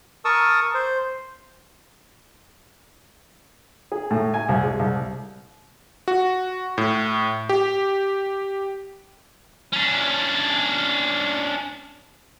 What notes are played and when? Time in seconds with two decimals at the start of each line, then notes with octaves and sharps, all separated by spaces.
0.25 A#4 A5 C#6 D#6 E6
0.74 C5
3.92 G#4
4.11 A2
4.34 G#5
4.49 C2
4.63 G#3
4.79 C2
6.08 F#4
6.78 A2
7.49 G4
9.73 C#4 D4